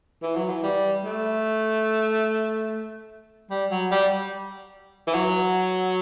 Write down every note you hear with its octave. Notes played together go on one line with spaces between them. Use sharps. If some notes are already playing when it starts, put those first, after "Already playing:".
E3
F#3
E3
G3
A3
G3
F#3
G3
E3
F#3